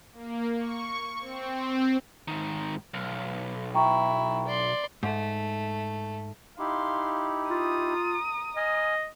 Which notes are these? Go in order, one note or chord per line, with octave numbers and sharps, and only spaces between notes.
A#3
C#6
C4
G#2 D#3
B1
E4 G5 A#5 C#6
D5 C6
G#2 A3
D#4 E4 G4 F5 C6
F4 A#5 D#6
D#5 G#5 F6